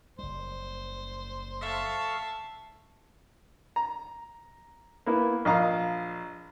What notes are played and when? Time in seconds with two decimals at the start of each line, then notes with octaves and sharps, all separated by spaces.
0.19 F#1 G3 C5
1.61 A4 E5 F5 A5 C#6
3.76 A#5
5.06 A#3 B3 E4
5.45 A#1 D#5 F5 A#5